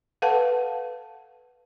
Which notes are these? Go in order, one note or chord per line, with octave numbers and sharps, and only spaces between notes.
A4 B4 F5 F#5 A5